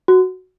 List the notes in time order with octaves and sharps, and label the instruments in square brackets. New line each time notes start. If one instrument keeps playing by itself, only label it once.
[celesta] F#4